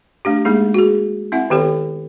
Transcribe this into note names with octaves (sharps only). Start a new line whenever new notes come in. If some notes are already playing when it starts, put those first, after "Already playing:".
A3 D4 G4
G#3 A#3 D#4 G#4
F#4 G#4
C4 E4 E5 F#5
D#3 B3 G4 A4 C#5